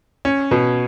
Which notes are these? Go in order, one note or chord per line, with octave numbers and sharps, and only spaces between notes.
C#4
B2